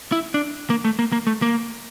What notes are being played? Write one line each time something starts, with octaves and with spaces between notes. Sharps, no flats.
E4
D4
A#3
A3
A#3
A#3
A3
A#3